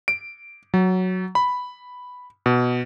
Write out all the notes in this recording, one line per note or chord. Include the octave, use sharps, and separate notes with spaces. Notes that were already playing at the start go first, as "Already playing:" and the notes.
D7
F#3
B5
B2